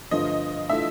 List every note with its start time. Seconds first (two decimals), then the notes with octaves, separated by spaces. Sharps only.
0.11 G2 D3 F3 A3 D#5
0.69 E3 A3 D4 F4 A4 E5